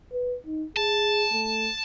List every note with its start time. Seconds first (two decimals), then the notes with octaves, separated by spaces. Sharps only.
0.13 B4
0.46 D#4
0.77 G#4 A5
1.33 A3